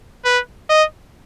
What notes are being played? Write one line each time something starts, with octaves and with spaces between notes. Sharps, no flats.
B4
D#5